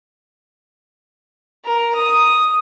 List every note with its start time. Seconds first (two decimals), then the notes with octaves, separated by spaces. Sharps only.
1.65 A#4
1.96 D#6